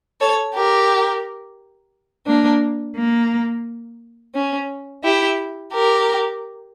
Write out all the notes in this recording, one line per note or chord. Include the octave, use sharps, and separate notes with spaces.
A4 C#5
G4 A#4
A#3 D4
A#3
C#4
E4 G4
G4 A#4